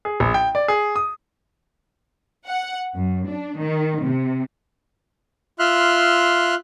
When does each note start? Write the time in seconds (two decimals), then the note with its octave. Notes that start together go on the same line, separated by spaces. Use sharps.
0.05 G#4
0.20 A#1
0.34 G5
0.55 D5
0.68 G#4
0.96 D#6
2.47 F#5
2.95 F#2
3.28 D4
3.59 D#3
4.02 C3
5.59 F4 E5 C6 F6 F#6